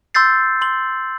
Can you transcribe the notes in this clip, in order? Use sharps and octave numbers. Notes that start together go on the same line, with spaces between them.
C6 E6 G6 A6 C7
C6 F#7